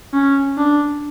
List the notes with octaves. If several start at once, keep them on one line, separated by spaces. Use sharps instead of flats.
C#4
D4